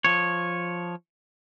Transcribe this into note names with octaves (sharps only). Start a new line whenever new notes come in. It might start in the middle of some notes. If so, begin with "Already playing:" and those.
F3 C#5